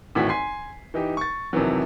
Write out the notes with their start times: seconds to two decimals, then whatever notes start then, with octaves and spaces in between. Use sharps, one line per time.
0.15 G#1 A2 E3 F#4 B6
0.29 G#5 C6 B6 C7
0.94 E3 D#4 G4
1.17 C#6 A6
1.53 F2 C3 D#3 E3 F#3